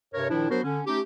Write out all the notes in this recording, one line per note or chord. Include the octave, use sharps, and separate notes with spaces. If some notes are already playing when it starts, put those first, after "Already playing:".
G2 C3 A#4 C#5
A#2 D#3 F3 D4 E4
F#3 B3 D4 F#4 A#4 C5
D3 C#4
A3 C#4 D#4 G4